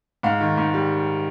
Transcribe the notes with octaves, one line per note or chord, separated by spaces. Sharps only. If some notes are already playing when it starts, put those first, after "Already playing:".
G#2 F5
D#3
G#2
G3